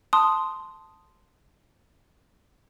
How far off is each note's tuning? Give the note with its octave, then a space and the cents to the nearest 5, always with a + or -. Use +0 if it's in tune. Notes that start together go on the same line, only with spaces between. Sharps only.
A5 +0 C6 -5 D#6 +0